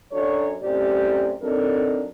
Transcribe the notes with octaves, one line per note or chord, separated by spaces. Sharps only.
F#2 F#3 D4 A4 C#5
F#2 A2 C3 C#4 G4 D5
F#3 C4 D4 D#4 A4 A#4